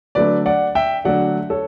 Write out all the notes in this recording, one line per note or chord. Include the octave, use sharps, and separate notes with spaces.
D3 F#3 A3 B4 D5
D5 F#5
E5 G5
D3 F#3 A3 D5 F#5
A4 C#5